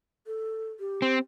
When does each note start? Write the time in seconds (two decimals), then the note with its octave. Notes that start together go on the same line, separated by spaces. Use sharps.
0.27 A4
0.80 G4
1.02 C4